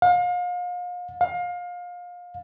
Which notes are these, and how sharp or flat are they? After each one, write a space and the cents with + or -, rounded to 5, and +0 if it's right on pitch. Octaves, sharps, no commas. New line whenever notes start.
F5 +40
F5 +30